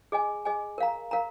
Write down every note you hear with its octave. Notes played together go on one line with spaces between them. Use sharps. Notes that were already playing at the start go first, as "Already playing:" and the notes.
G#4 D#5 G#5
G#4 D#5 G#5
A#4 F5 A#5
A#4 F5 A#5